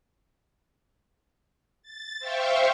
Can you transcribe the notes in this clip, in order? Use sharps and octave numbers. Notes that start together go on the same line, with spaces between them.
A6
C5 E5 F5 G5 C#6